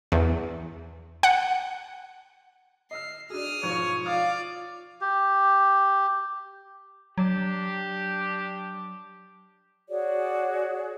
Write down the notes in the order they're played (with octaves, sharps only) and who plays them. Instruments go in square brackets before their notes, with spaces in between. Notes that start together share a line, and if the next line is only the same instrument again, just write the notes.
[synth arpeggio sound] E2
F#5
[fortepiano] D#5 E6 F6 [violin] C7
[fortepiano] D4 G#4 [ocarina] F#4 [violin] D#6 F6
[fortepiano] F2 G#2 B2 [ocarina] F4 [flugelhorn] C#5
[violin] D5 [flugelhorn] F5 [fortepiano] D#6
[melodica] G4
[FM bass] F#3 [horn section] D4 G4
[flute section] F#4 G#4 C#5 D5